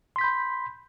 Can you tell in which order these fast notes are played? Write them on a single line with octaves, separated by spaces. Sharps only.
C6 B6 G6 B5